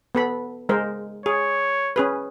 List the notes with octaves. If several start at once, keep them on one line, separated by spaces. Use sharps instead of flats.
B3 A4 B5
G#3 A#4 C5
G#4 C#5
C#4 G#4 B4